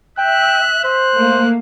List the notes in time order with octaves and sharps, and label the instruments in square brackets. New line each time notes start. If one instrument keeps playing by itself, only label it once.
[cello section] E5 [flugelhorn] G5 [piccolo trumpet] F#6
[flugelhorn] C5 [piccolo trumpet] F#6
[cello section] A3 A#3